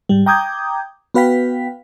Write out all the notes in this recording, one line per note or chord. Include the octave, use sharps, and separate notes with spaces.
G#2 G3
G5 A#5 D6 D#6 G6 G#6
B3 F#4 B4 F5 G5 B6